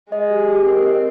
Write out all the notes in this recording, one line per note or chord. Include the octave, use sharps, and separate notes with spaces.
G#3 D#5
G4
G4
C4 A#4
D#5